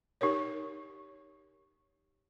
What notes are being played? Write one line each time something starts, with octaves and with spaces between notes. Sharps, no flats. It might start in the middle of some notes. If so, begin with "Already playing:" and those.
D#4 G4 A#4 C#5